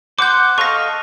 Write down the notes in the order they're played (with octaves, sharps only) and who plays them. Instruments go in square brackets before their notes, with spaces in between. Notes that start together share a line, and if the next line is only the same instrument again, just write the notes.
[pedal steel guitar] C5 F#5 [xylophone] D6 G6
[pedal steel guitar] A4 D#5 F5 [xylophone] C#6 A#6